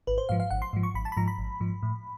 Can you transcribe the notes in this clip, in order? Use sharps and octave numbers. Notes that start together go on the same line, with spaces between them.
G#1 B4
C5
G#2 F3 F5
F5
G#1 F#5
C6
G#2 F3
C#6
G#1 B5
A5
B5
G#2 F3 A#5
B5
G#1
G#2 F3
A2